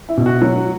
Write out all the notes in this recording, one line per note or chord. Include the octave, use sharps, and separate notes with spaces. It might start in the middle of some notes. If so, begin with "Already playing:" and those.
E4
B2
F#4
F#3